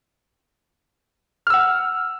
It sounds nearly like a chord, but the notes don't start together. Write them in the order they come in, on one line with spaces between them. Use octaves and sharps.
F6 E6 F#5